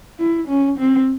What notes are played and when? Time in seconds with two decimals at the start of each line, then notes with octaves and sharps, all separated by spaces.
0.19 E4
0.48 C#4
0.78 C4